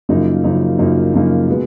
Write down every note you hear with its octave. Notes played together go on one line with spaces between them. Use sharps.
F#2 C#3 F3 A#3 D#4
F#2 C#3 F3 A#3 D#4
F#2 C#3 F3 A#3 D#4
F#2 C#3 F3 A#3 D#4
B2 G#3 B3